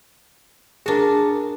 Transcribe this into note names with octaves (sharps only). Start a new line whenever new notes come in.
D4 F#4 G#4 A#4